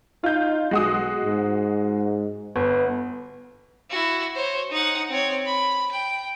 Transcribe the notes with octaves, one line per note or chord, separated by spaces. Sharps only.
D#4 F4 G6
B1 G#3 F#4 D#6
G#2
G1 B3
E4 F#4
C5 C#5
D#4 F#5
C4 C#5
B5
G5